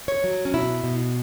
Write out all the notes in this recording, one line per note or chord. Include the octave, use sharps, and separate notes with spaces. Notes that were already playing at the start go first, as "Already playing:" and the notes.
C#5
F#3
C#4
B2 E4
B2